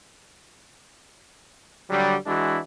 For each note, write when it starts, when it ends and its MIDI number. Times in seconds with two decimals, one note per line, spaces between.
1.90 2.16 50
1.90 2.16 54
1.90 2.16 55
2.26 2.59 52
2.26 2.59 56
2.26 2.59 62
2.26 2.59 64
2.26 2.59 66